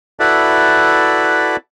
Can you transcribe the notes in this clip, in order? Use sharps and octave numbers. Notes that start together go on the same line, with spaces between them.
E4 F#4 A4 B4 D5 E5